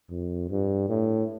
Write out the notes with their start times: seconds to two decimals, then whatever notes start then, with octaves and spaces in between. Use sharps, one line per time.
0.10 F2
0.50 G2
0.89 A2